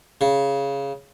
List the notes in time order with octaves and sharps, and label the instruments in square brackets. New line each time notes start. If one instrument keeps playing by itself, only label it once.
[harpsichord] C#3